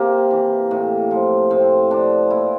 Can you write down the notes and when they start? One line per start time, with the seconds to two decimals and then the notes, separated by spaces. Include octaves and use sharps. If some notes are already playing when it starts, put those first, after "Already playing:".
Already playing: C3 A#3 G4
0.31 E3
0.71 A2
1.11 F3
1.51 A2 C4
1.90 F3 D4
2.30 A#2 E4